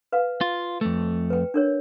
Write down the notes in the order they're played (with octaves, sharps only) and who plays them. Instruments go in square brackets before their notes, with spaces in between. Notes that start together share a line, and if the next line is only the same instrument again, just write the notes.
[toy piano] B4 F5
[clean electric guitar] F4
F2 A3
[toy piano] B4 G5
D4 A#4 C#5